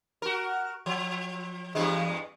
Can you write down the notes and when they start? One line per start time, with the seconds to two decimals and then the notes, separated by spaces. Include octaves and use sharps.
0.22 F#4 A#4
0.86 F3
1.75 E2 G2 G#3